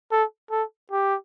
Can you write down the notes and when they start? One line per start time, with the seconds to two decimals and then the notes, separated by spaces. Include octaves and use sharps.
0.12 A4
0.51 A4
0.92 G4